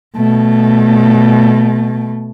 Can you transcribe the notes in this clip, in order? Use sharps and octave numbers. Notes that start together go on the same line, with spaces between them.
B2 A3